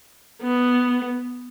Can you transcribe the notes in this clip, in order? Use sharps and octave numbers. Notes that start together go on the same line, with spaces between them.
B3